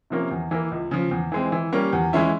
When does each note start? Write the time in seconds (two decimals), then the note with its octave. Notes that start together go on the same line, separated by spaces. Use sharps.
0.10 C3 F3 A#3 C#4
0.31 E2
0.51 E3 A#3
0.71 C#2
0.91 C#3 F3
1.11 E2
1.32 E3 G#3 C4
1.52 E3
1.73 G3 A#3 C#4
1.93 E2
2.13 E3 G#3 C#4 E4